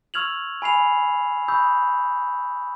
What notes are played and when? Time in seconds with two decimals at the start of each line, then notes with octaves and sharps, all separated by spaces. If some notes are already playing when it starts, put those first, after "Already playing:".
0.14 C#6 E6 F6 G#6 F7 F#7
0.62 G#5 B5 C7 F7
1.48 B5 C#6 D#6 E6 G6